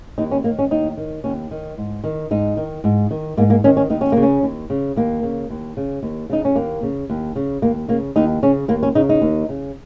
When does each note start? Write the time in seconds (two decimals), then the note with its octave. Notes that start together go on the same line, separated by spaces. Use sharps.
0.18 D#2 D#4
0.31 C#4
0.44 D#3 A#3
0.59 C#4
0.71 D#2 D#4
0.97 D#3
1.24 D#2 C#4
1.51 D#3
1.78 G#2
2.04 D#3
2.31 G#2 D#4
2.57 D#3
2.84 G#2
3.11 D#3
3.37 G#2 A#3
3.50 A#3
3.64 D#3 C#4
3.77 C#4
3.90 D#2 D#4
4.01 C#4
4.12 C#3 A#3
4.23 C#4
4.43 D#2
4.70 C#3
4.96 D#2 A#3
5.23 C#3
5.50 D#2
5.77 C#3
6.03 D#2
6.30 C#3 D#4
6.45 C#4
6.56 D#2 A#3
6.83 C#3
7.09 D#2
7.36 C#3
7.62 D#2 A#3
7.88 C#3 A#3
8.16 D#2 D#4
8.43 C#3 C#4
8.68 D#2 A#3
8.83 C#4
8.95 C#3 D#4
9.09 D#4
9.21 D#2
9.49 C#3